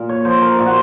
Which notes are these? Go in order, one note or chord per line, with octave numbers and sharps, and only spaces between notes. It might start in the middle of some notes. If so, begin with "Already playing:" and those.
Already playing: A#2
C#5
F3 C5
A#4
A#2 F4
F#4